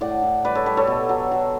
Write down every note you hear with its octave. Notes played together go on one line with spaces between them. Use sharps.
A2 D5 F#5
A2
G3 B4 D5
A4 C#5
G3 G4 B4
A4 C#5
B2
F#3
F#3